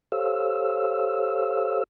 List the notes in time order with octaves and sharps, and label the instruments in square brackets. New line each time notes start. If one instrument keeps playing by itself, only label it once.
[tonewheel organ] G4 A4 C5 C#5 F5 E6